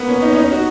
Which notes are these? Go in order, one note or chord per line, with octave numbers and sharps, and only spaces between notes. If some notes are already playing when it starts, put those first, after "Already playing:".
Already playing: A#3 B3
C#4
D#4
C#4
D#4
F#4